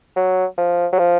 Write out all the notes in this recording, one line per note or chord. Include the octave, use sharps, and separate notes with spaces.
F#3
F3
F#3
F3